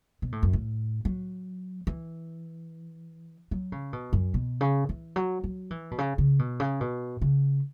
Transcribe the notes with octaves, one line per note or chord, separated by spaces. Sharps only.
B2
A2
F#2
A2
F#3
E3
F#3
C#3
B2
F#2
B2
C#3
E3
F#3
F#3
E3
B2
C#3
C#3
B2
C#3
B2
C#3